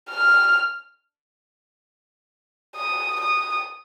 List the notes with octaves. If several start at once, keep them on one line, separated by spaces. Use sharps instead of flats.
F6
D#6
D#6